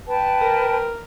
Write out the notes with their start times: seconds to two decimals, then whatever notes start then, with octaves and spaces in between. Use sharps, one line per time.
0.08 B4 G5 A5
0.41 A#4